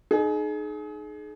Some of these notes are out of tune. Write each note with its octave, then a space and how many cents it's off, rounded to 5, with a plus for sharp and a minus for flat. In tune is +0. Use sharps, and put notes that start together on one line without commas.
D#4 -25 G#4 +30